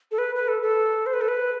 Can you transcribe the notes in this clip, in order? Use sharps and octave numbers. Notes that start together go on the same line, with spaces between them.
A4
B4
B4
A4
A4
C5
B4
A4
B4